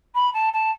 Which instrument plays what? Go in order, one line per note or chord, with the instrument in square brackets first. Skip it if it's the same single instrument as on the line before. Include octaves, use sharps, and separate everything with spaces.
[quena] B5
A5
A5